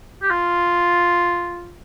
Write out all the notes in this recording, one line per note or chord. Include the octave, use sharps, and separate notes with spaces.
G4
F4